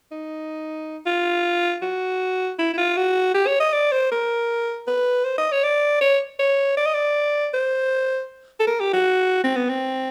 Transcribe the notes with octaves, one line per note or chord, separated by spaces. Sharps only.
D#4
F4
F#4
E4
E4
F4
F#4
G4
C#5
D#5
D5
C5
A#4
B4
C5
D#5
C#5
D5
C#5
C#5
D5
D#5
D5
C5
A4
A#4
G4
F#4
C4
B3
C4